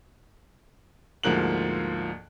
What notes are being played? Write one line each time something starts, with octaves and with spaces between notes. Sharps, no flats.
D2 G#2 F3 A#3 F#6 F#7